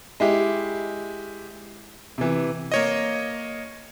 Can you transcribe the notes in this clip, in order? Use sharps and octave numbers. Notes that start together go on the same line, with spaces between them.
G#3 E4 G4
C3 E3
A#3 C#5 D#5